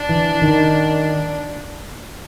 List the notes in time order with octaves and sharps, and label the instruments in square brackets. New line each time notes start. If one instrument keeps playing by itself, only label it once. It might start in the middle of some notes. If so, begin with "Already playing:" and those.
Already playing: [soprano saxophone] D4
[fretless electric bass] E3
D#3